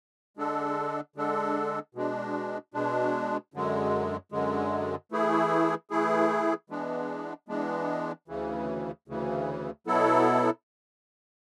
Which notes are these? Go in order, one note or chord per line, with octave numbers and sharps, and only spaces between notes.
D3 G#3 D4 A4
D3 G#3 D4 A4
B2 G#3 D4
B2 G#3 D4
F#2 D3 G#3
F#2 D3 G#3
E3 A3 E4 G#4
E3 A3 E4 G#4
E3 G#3 B3 D4
E3 G#3 B3 D4
D2 C#3 E3
D2 C#3 E3
B2 F#3 B3 E4 A4